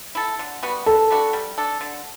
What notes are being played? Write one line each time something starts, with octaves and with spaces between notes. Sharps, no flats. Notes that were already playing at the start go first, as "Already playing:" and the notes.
E4 A4
D3
G3 B3 F#4
B2 A4
G3 D4 F#4
G3
D4 A4
D3